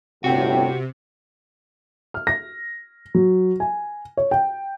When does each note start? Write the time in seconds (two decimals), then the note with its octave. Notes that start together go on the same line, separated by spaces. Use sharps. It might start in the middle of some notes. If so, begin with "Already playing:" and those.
0.24 G1 A2 C3 F#4 G5
2.14 F6
2.27 A#6
3.15 F#3
3.60 G#5
4.17 C#5
4.31 G5